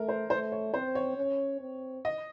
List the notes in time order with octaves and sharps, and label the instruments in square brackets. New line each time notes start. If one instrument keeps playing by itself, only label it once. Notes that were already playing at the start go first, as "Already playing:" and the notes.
Already playing: [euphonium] A3 [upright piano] A#4
[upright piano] C5
[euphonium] A3 [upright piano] C5
[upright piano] C#5
[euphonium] C4 [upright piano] C5
[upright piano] C#5
[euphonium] C#4
C4
[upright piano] D#5